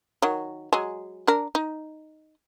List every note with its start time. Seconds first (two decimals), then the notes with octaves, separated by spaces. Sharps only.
0.22 D#3 F#3
0.73 F#3 G#3 G#5
1.27 D4 A#4
1.55 D#4